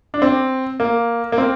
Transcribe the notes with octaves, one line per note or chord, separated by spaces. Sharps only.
D4
C4
A#3
A#3
C4